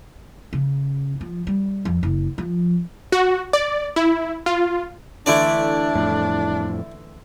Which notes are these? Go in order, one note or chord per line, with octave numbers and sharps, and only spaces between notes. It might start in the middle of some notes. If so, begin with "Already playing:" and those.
C#3
F3
G3
F2
F#1
F3
F#4
D5
E4
F4
D3 E3 A3 D4 E4 D5
F2 A2